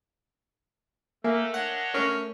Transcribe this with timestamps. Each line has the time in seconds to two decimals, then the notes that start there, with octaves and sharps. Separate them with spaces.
1.24 A3 A#3 A4 A#4 E5 G#5
1.54 D4 C#5 D#5 F#5
1.94 A3 C#4 A#4